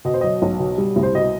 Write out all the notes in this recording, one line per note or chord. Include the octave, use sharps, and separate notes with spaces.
B2 D#5
C5
F#3 D#5
B1
B2
G3
C2
C5
B2 D#5